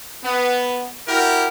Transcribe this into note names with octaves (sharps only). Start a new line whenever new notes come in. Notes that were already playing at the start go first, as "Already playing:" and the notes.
B3
E4 F#4 G4 A#4